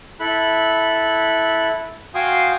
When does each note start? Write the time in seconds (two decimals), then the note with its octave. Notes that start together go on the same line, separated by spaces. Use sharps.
0.20 E4 A4 B5 F#6
2.15 F#4 F5 G5 G#5 C6 D#6